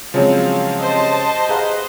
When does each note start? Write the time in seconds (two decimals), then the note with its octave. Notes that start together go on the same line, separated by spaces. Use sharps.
0.14 C#3 F3 F#3 G#3 C4 C#5 F5
0.80 G4 C5 D#5 A5
1.49 G#4 B4 F5 F#5 A#5